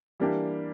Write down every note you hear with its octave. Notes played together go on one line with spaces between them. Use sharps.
E3 G3 A#3 D4 G4